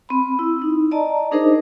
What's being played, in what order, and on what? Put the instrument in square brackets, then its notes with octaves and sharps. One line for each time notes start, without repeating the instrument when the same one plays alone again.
[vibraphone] C4 B5
E4
D#4
D5 D#5 A5 A#5
D4 D#4 G#4 A#4 C5 D#5